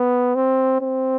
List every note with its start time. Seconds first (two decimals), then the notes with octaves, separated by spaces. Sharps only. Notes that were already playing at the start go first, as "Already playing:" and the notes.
Already playing: B3
0.35 C4
0.81 C4